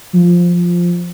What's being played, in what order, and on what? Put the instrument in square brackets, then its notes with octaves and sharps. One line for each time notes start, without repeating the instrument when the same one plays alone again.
[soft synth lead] F3